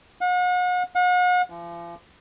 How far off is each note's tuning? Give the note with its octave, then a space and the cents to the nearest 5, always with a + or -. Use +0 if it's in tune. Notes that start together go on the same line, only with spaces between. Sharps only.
F#5 -40
F#5 -40
F3 -40